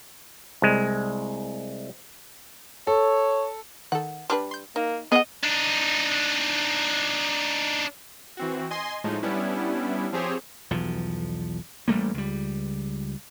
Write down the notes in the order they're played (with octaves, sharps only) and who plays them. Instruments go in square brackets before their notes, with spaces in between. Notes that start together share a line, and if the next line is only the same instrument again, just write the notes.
[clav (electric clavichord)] C2 G#3
[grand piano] A4 [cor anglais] C#5
[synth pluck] D#3 A4 [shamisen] F#5
[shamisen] G3 D4 B4 [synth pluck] C6 D6 F6
[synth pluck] C6 G6
[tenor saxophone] A#3 [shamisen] D#4
[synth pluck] B3 D#6 [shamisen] G#4 F#5 [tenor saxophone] D#5
[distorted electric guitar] D4 D#4
[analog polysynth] E3 C4 F#4
D#5 G#5 C6
A2 F3 G#3 A3 D#4
G3 B3 C#4 D4 E4
F3 C4 G4 G#4 C5 C#5
[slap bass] B1 E2 F3
A1 G3 A3 A#3
C#2 G3